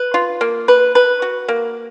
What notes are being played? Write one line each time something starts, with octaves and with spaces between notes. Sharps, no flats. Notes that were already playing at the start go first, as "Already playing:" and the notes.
Already playing: B4
F4
A#3
B4
B4
F#4
A#3